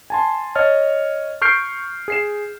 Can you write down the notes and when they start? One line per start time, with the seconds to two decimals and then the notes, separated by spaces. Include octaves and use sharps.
0.10 G#5 A5 C6
0.55 C#5 D#5 F6 A6
1.42 C#6 F6 G6 C7 D7
2.08 G#4 C7 E7